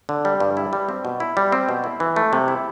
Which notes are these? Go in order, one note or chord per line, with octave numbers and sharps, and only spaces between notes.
D3
G3
G2
E4
G3
C4
B2
E4
G3
C4
B2
E4
E3
A3
C3
E4